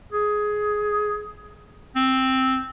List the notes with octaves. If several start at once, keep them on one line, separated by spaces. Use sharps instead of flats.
G#4
C4